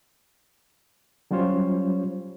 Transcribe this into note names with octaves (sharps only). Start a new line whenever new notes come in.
F#3 G3 C#4 F4 C5 C#5